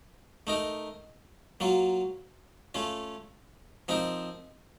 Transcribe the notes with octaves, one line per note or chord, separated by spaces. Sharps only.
A3 D#4 A#4
F#3 A#3 F4
A3 C#4 F4
F3 C4 D#4 A#4